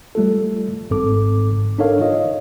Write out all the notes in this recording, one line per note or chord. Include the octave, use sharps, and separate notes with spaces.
G3 A3 F4 A4
G#1 G#2 C4 A4 D6
D4 D#4 A4 A#4 C#5 F5
F4 C#5 D#5